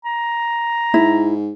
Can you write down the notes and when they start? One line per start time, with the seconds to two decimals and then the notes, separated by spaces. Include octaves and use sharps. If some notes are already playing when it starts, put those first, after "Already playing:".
0.05 A#5
0.94 G#2 E4